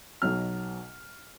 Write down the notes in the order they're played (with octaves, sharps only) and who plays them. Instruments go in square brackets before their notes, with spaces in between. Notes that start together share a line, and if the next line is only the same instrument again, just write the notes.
[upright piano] B1 B2 F#3 F6